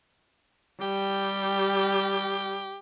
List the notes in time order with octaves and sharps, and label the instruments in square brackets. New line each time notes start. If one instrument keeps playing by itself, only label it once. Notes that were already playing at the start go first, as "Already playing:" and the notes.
[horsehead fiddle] G3 [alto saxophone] G4